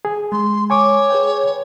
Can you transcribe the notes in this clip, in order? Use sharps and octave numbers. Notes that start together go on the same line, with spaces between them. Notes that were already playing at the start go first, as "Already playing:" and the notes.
G#4
G#3 C6
C#5 G#5 C#6 D6
G#4 B4 G5